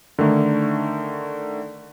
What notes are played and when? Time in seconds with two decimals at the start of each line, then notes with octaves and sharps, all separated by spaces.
0.19 D3 D#3 A3 D#4